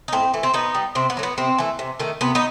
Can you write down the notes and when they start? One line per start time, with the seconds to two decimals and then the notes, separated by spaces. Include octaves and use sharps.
0.08 D#4
0.12 A2 C4
0.34 E3 A3
0.43 C4
0.54 B2 B3 D#4
0.74 G3
0.95 C3 C4
1.10 B3
1.17 F#3 A3
1.23 B3
1.38 C3 C4
1.58 E3 A3
1.79 C3
2.00 D#3 A3
2.21 C3 B3
2.35 B3 D#4